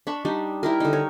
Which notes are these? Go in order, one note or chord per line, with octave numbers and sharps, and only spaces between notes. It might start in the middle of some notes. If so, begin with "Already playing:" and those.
D4 B5 C#6
G3 D4 D#4
E4 G4 A#4
D3 D#4
C#5